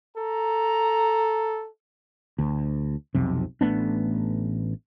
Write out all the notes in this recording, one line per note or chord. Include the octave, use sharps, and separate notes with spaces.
A4 A#5
D2
B1 F2 C3
A1 A3 B3 D4